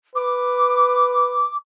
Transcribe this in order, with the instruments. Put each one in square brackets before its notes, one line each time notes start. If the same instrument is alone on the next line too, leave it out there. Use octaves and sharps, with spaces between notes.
[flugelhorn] B4 [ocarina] D6